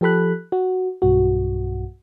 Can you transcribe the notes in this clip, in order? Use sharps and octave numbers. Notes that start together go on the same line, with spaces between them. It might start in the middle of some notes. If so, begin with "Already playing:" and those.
F3 G4 A4 B5 F#6
F#4
B1 G2 F#4